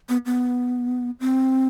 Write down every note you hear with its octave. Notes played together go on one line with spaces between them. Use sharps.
B3
B3
C4